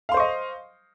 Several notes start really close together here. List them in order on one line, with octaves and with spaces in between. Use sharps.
F5 C6 C5 C#6 D#5